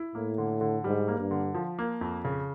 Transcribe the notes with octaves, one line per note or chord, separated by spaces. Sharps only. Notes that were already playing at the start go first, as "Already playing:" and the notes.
Already playing: E4
A2 A#3
D3
D3
G#2 G3
A#3
G2
D3
F3
A#3
F2
C#3